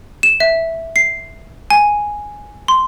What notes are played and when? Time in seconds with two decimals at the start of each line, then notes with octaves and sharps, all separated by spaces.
0.23 E7
0.40 E5
0.96 C7
1.70 G#5
2.68 C6